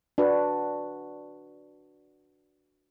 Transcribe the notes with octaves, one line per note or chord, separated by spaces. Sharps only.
D4 F#4 B4